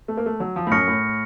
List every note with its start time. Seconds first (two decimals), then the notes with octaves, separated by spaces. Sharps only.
0.08 A3
0.17 A#3
0.26 A3
0.40 F#3
0.56 F3
0.67 A2
0.72 F#2 C#6 F6 A#6 C#7
0.88 A2